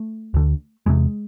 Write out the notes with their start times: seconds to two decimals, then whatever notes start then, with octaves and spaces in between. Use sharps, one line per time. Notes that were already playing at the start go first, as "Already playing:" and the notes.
Already playing: A3
0.34 D2 D3
0.86 E2 C3 G#3